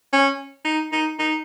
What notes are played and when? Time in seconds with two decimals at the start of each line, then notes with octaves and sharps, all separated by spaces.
0.13 C#4
0.65 D#4
0.92 D#4
1.19 D#4